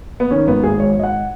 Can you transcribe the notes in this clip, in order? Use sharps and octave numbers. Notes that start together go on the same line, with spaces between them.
B3
D#3 C#4
G#1 B3
G#1 G#4
G#2 C#5
G#1 D#5
F#5